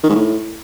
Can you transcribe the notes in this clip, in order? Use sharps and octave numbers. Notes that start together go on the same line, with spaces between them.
D#3
G#2
A2